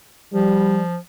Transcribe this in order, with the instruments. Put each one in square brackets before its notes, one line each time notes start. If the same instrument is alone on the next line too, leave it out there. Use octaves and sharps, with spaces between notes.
[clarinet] F3 [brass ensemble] G3